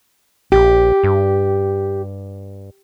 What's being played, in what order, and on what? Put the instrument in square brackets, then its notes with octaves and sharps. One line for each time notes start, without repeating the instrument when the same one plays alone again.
[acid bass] A#1 [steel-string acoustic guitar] G4
[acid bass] G2